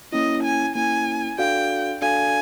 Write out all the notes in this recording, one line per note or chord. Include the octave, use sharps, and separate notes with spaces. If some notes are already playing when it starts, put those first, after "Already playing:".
A#3 C#4 E4 D#5
G#5
A#3 C#4 E4 G#5
D4 F#4 A4 D5 F5 G5
D4 F#4 A4 D5 F5 G#5